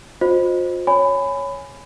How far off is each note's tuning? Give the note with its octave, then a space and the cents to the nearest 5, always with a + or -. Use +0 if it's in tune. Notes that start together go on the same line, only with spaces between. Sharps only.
F4 +40 C5 +0 D#5 -10
C#5 +5 G#5 +0 B5 +20